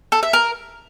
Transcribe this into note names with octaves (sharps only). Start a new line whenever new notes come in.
A4
E5
A#4